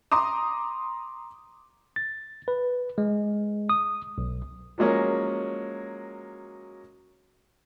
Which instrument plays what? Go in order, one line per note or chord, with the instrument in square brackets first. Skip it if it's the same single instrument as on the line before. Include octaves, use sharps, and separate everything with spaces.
[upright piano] A#5 C6 D6 D#6
[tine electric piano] A6
B4
G#3
D#6
B1
[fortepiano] F3 F#3 G#3 A#3 C#4